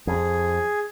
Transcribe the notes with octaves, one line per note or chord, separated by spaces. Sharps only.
F2 G#4